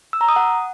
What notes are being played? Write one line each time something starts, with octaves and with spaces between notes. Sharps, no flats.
E6
A#5
D#6
F#5